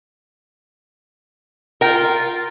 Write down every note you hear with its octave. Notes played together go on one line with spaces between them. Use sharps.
F4 A#4 G5